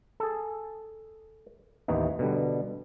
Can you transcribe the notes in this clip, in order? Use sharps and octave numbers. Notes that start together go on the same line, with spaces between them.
G#4 A4
A1 D#2 E3 B3 D#4
B2 D3 G3